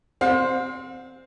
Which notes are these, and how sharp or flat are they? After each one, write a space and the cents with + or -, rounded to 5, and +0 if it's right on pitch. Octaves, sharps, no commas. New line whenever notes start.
C4 +0 F5 +45